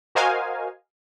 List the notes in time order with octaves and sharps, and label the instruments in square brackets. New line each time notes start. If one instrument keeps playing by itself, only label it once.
[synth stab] F#4 A#4 C5 D#5 F5 G#5